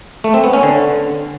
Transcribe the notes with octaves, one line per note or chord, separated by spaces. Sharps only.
A3
C4
B3
C#4
D3